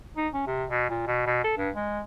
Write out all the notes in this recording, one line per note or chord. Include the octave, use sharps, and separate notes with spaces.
D#4
C#4
C3
B2
A#2
B2
B2
A4
G2
G#3